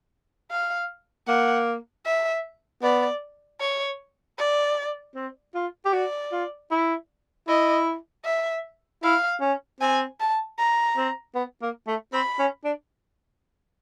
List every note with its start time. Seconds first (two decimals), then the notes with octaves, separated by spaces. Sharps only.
0.51 F5
1.27 A#3 F#5
2.06 E5
2.83 B3 D5
3.60 C#5
4.38 D5
5.15 C4
5.55 F4
5.85 G4
5.93 F#4 D5
6.32 F4
6.71 E4
7.48 E4 D#5
8.25 E5
9.03 E4 F5
9.41 C#4
9.80 C4 G#5
10.20 A5
10.59 A#5
10.97 C4
11.35 B3
11.62 A#3
11.87 A3
12.13 C4 B5
12.39 C#4
12.64 D4